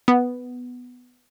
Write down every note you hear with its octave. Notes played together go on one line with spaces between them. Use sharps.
B3